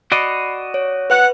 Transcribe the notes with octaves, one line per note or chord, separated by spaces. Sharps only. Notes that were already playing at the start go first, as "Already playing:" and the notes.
F#4 D5 D#5 B5 C7 C#7
C#5
B4 F#5